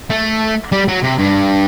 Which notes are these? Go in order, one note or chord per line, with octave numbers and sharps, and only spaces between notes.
A3
G3
F#3
C3
G2